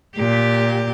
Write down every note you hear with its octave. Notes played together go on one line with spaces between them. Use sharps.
A#2 G4